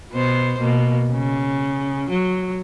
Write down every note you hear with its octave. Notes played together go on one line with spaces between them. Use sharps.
B2 B3 C5
B2 A#3
C#3
F#3